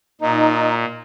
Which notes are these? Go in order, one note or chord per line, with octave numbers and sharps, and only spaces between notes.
A#2 D#4